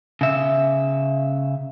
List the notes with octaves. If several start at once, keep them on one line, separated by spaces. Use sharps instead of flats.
C#3 E5